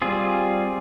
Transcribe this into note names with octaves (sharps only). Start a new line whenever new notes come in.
G3 C4 F4 G#4